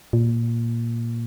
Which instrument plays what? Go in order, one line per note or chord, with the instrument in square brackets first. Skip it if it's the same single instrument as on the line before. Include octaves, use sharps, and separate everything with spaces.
[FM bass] A#2